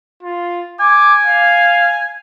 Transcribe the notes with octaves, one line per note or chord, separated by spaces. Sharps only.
F4
G#5 D6
F5